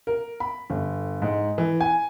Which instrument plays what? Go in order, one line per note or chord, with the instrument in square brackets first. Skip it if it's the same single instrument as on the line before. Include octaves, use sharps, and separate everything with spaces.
[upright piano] A#4
B5
G1
G#2
E3
G#5